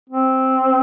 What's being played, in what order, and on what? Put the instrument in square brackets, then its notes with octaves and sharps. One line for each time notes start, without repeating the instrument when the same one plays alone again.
[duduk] C4